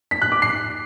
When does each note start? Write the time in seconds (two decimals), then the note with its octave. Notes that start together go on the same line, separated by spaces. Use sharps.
0.11 B6
0.22 F#6
0.32 D6
0.42 C7